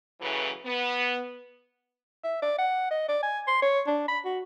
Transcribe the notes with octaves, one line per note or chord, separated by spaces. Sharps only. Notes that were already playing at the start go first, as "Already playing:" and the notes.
A2 C#3 E3 F#3 C#4 B4
B3
E5
D5
F#5
D#5
D5
G#5
C6
C#5
D4
B5
F#4